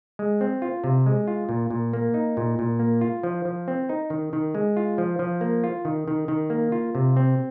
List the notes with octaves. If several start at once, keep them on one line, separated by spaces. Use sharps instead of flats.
G#3
C4
F4
C3
G#3
F4
A#2
A#2
A#3
D#4
A#2
A#2
A#3
F4
F3
F3
C4
D#4
D#3
D#3
G#3
F4
F3
F3
A#3
F4
D#3
D#3
D#3
A#3
F4
C3
C4